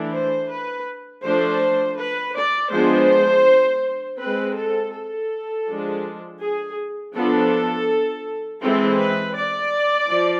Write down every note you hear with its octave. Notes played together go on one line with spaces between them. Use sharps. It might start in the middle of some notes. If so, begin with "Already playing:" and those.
Already playing: E3 A3 D4
C5
B4
F3 A3 D4 C5
B4
D5
F3 G#3 B3 D4 C5
G#3 C4 B4
A4
A4
F3 G#3 D4
G#4
F3 B3 D4 A4
E3 G#3 C4 A4
B4
D5
F3